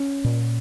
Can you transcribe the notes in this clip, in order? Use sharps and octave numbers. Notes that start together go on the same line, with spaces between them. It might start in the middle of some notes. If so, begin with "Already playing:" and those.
Already playing: C#4
A#2